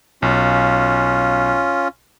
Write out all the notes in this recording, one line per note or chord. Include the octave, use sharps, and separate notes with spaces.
B1 C#4 F4